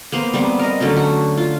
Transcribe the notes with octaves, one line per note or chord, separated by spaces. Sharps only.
A#3 B3 C5
G3 B3 C4
A#4 D#5
D3 F#3 A3 C#4
F#4
F4